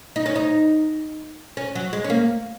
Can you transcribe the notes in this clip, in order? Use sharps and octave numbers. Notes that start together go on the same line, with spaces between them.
D#4
C#4
D#4
C#4
F#3
G#3
C#4
A#3